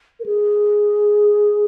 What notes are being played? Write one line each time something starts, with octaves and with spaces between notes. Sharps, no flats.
A#4
G#4